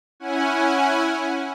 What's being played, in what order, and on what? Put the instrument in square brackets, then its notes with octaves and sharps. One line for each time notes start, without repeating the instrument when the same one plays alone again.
[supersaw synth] C#4 E4 F#5 G#5